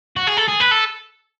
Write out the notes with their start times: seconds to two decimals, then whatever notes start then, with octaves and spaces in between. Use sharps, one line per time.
0.16 F#4
0.27 G#4
0.37 A4
0.48 G#4
0.60 B4
0.71 A4